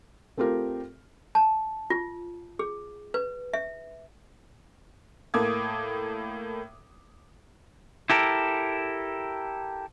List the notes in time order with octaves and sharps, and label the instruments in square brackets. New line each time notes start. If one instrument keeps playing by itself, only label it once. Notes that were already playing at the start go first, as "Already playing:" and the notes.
[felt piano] A3 C4 F4 G4 A#4
[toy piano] A5
F4
G#4
B4
E5
[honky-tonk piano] A2 A#3 A4 D6 D#6 G#6
[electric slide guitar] E4 G4 A4 A#4